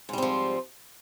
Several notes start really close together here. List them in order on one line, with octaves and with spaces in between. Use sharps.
G#2 G3 C4 F3